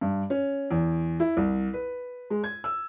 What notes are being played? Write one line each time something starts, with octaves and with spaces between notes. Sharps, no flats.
G2
C#4
E2
E4
C2
B4
G#3
G#6
E6